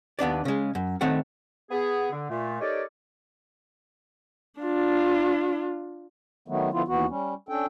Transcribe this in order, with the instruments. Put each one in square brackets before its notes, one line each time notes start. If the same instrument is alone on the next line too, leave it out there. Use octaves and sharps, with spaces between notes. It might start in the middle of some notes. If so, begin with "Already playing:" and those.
[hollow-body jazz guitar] D#2 B3 D4 D5
C#3 G#3
F#2
D#3 A3 C4 C#5 F#5
[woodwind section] B3 G#4
D3
A#2 A3
D#4 G4 A4 A#4 C#5 D5
[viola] D4 F4
[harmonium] D#3 F#3 A3 B3
D3 F3 B3 E4 F4
D#2 E3 B3 F#4
G3 C#4
C#4 D4 A4 G5